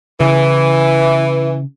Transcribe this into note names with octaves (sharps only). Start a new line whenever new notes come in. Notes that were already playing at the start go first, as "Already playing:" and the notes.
C#3 E3